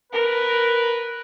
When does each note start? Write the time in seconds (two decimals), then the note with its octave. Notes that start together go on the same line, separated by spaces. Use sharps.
0.13 A#4 B4